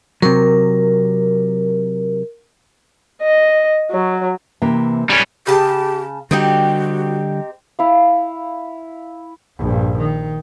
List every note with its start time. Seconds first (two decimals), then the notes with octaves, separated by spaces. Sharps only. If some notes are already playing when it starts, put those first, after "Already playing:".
0.22 C3 F#3 A#4
3.22 D#5
3.91 F#3
4.62 C3 E3 A#3
5.10 G3 C#4
5.47 C#3 G4 A5
6.31 D3 G3 C4 D#4 F#4 G4
7.79 E4 F5
9.58 A#1 G2
9.98 D#3